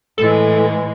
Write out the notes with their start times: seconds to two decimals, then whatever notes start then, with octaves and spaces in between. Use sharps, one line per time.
0.18 A2 E3 G#3 A4